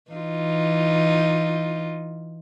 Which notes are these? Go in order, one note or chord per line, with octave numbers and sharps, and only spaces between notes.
E3 D#4 F4